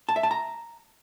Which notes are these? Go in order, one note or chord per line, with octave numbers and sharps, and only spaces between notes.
A5
E5
A5
A#5